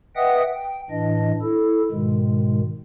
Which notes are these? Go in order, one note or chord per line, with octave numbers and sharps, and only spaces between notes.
B4 D#5 E5 F#5 G5 D#6
G5
A2 E3 D4 D#5
E4 A4
G#2 B2 D#3 G#3